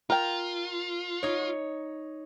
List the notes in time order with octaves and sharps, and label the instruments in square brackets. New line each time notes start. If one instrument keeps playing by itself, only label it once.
[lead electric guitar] F4 [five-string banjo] A#4 G5
[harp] D#4 C#5